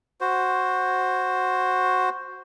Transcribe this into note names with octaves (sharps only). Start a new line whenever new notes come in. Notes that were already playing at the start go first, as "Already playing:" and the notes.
F#4 C5